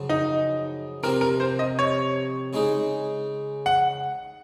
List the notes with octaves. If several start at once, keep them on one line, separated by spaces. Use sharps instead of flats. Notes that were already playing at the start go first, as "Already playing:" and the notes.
Already playing: F#2 C#3 F3
D#4
C3 F3 C4 A#4
A#4
C5
D#5
C#5
C#3 G#3 D#4
F#5